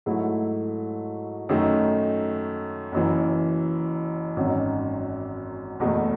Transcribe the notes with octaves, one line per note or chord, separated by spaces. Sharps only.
G#2 F#3 A3 E4
F#2 D#3 A3 D#4
F#1 F#2 E3
G#1 F#2 D#3 F#3 C#4
F#1 E2 B2 A3